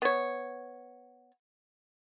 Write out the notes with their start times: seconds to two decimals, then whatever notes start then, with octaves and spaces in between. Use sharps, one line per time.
0.02 B3 C#5